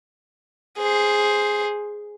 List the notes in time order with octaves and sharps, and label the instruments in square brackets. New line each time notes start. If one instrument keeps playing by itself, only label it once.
[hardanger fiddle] G#4 C5